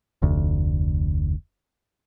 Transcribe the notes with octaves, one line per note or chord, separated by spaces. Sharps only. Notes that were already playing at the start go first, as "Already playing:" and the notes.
F1 D2